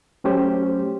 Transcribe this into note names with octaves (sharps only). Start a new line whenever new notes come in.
F#3 A3 C#4 G4 C5